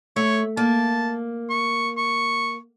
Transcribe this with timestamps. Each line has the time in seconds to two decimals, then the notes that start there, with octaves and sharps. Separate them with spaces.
0.16 A3 C#5
0.57 A#3 A5
1.50 C#6
1.98 C#6